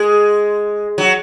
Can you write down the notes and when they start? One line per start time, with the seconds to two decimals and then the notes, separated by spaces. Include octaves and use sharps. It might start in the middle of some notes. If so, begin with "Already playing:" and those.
Already playing: G#3
0.98 F#3